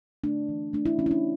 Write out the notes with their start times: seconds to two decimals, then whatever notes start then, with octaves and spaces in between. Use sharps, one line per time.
0.24 A3 D4
0.49 E3
0.73 A3 D4
0.86 E4
0.98 E3 C#4
1.06 E4
1.11 D4